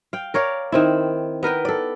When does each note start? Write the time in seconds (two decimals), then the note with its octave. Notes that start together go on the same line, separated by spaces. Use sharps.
0.13 F5 G5
0.34 A#4 C#5 D5 F5
0.72 D#3 C4 E4
1.43 B3 A#4 B4 G5
1.65 A4 D5